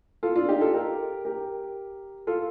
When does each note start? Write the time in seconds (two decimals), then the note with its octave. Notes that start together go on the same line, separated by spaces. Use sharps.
0.23 F4 A4
0.36 D4 F4
0.49 D#4 G4
0.61 F4 A4
0.74 G4 A#4
1.25 G4 A#4
2.27 F4 A4